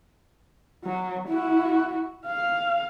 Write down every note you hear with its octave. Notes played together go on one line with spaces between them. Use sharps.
F#3
E4 F#4
F5